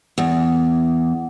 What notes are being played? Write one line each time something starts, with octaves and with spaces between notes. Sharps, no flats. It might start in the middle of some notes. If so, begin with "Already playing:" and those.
E2